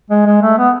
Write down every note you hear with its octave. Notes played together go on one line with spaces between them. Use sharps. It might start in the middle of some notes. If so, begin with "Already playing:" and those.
G#3
G#3
A3
B3